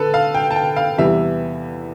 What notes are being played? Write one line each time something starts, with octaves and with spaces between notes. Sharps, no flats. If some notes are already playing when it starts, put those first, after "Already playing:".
Already playing: D3 A4 B4
F5
G5
A5
G5
F5
E2 C3 E3 G3 E5